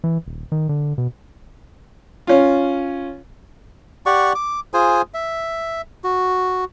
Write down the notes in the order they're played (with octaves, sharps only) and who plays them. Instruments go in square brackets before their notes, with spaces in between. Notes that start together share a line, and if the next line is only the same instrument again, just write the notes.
[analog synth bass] E3
D#1
D#3
D3
B2
[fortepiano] C#4 F4
[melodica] G4 D5 F#5 C#6
D6
F4 G#4 C5 G#5
E5
F#4